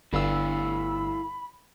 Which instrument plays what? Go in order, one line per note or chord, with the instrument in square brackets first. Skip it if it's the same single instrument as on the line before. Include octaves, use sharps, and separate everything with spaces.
[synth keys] G1 E6 [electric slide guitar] E4 A4 F5 [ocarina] B5